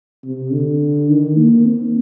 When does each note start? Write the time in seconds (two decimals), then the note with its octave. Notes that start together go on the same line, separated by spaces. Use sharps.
0.24 C3
0.52 D3
1.09 D#3
1.37 A#3
1.65 C4